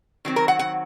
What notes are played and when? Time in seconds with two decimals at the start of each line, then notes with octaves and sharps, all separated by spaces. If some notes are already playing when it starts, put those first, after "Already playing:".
0.25 D#3 F#3 C4
0.36 A#4
0.48 F#5
0.59 F#5